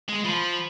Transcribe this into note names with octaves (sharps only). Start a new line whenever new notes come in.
G#3
F3 B5